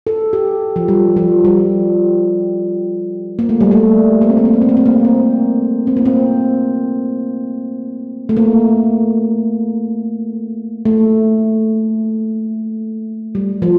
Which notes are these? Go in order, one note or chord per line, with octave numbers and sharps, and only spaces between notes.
A4
G4
F3
G3
F3
G3
A#3
A3
G3
A3
A#3
C4
A#3
C4
A#3
C4
A#3
C4
A#3
C4
C4
A#3
C4
A3
A#3
A3
G3
F3